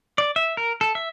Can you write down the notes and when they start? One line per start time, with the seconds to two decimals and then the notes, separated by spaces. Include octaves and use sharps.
0.18 D5
0.36 E5
0.57 A#4
0.81 A4
0.95 E5